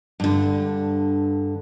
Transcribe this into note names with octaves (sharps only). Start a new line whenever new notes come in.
G2 D3